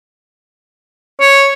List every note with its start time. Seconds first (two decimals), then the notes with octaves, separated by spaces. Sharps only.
1.20 C#5